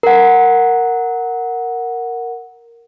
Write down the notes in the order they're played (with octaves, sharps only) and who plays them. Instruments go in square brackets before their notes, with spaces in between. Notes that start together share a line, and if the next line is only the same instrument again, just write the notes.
[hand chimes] A#4 F#5